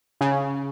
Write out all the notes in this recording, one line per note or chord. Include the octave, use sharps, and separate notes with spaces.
C#3